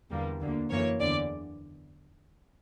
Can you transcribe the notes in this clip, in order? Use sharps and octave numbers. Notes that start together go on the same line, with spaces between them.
E2 D3 G3 A#3
D2 D3 A#3
F#2 E3 A#3 C#5
E2 D3 D5